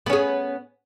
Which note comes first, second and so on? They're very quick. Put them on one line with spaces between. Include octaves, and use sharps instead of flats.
B3 C#4 G#4